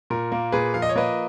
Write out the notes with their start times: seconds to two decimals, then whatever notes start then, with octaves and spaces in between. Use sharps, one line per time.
0.10 A#2 A#4
0.32 A#3
0.52 A#2 G#4 B4
0.74 F3 F5
0.82 D#5
0.89 C#5
0.96 A#3 B4 D#5